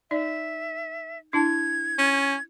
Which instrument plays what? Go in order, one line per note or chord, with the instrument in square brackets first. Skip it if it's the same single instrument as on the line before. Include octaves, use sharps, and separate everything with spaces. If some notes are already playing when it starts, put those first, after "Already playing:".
[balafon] D#4 D5 [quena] E5
[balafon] D4 E4 A5 [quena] G#6
[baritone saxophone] C#4